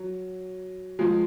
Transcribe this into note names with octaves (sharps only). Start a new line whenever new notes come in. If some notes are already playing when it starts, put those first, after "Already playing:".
Already playing: F#3
F3 G#3